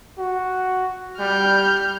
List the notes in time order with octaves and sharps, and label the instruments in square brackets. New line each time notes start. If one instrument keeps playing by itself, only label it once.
[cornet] F#4
[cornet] G3 [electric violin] F6 G6